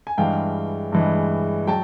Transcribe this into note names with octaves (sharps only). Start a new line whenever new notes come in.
G#5
G2 E3 G#3 F5 G5
G2 E3 G#3
F#3 G5 A5